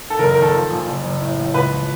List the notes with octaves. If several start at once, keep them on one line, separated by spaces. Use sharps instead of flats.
A4
F#1 A#4
A#4
D#3
A4
F3
A#1
F#1
F#1
A2
A1
C#2 B4
F3